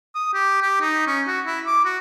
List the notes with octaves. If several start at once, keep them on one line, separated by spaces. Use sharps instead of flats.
D#6
G4
G4
D#4
C#4
F#4
E4
D6
F#4